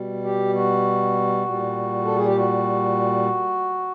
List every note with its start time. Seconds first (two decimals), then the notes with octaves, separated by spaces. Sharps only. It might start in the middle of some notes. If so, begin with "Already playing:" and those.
Already playing: B2 G3
0.24 G4
0.55 F#4
1.46 A#2 G3
2.05 A4
2.16 G#4
2.26 G4
2.37 F#4